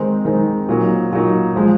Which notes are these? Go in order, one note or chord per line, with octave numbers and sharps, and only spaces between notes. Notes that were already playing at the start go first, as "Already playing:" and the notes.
Already playing: D#3 G#3 C4 D#4
D#3 G#3 C4 D#4
A#2 F#3 A#3 D#4
A#2 F#3 A#3 D#4
F3 G#3